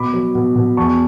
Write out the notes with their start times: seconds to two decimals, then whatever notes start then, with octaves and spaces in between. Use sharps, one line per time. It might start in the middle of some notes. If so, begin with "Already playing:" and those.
Already playing: B2 B5 D6
0.14 F#3
0.35 B2
0.56 B2
0.77 E2 A5 C#6